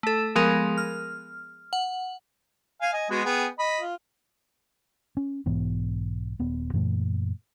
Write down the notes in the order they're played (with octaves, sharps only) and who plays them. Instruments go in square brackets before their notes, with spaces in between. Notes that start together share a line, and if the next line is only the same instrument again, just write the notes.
[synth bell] A3 A4
F3 G#3 B3 G#4 A#4
F6
F#5
[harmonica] F5 G#5
D#5 G#5
G#3 B3 F#4
B3 G#4 G5
D#5 B5
F4
[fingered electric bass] C#4
B1 G#2 E3 B3
D#1 B3
F#2 A#2 E3 A3